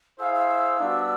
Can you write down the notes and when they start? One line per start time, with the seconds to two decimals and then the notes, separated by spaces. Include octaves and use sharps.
0.19 E4 G#4 C5 F5 E6
0.34 E6
0.49 E6
0.79 G3 B3 D4 F#4